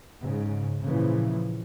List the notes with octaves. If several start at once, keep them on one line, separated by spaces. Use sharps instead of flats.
G#2 C#3
A#2 C#3 E3 F3